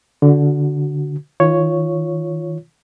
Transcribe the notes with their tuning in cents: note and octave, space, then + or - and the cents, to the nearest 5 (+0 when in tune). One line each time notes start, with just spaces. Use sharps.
D3 -15 F#4 +0
D#3 +35 F4 +0 C#5 +0